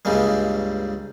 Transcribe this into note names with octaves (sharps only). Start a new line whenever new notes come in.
C#2 G2 C#3 G3 G#3 A#3